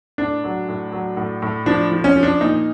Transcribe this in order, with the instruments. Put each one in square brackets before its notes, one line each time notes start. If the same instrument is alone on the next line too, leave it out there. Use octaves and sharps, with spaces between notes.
[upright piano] A2 D4
F#3
A2
F#3
A2
A2
F3 D4
F3
C#4
F3
D4
A#2 D#4